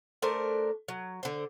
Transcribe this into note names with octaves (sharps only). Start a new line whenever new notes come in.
A3 D4 A#4 C5
F#3
D3 C5